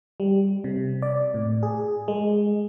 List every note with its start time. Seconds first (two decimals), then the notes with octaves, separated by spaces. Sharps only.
0.20 G3
0.64 C3
1.02 D5
1.34 A2
1.63 G#4
2.08 G#3